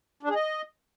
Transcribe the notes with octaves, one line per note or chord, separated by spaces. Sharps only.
D4
G#4
D#5